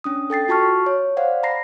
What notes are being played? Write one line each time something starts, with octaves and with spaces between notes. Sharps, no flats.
C#4 D4 D#6
A4 G5 A6 C7
F4 F#4 A5 C#6 F6
C#5
C5 D5 F5 F#5
A#5 B5 A#6 C7